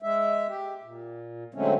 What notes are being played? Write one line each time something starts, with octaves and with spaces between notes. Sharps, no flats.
G#3 E5
G4
A#2
D3 F#3 G#3 A3 C4 C#4